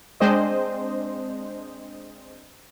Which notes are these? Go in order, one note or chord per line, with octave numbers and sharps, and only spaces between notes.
G#3 C4 D4 C5 D#5